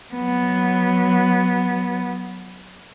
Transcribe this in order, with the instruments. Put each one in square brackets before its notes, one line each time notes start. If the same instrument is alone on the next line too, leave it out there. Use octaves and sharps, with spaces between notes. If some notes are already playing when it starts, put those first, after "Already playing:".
[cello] F#3 B3